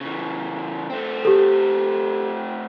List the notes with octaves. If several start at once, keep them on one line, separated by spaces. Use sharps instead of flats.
C#3 E3
A3 C4
G4 A4